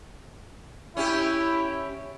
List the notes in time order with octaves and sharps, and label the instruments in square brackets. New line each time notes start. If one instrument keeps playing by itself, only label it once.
[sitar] C#4 G4 [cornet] E4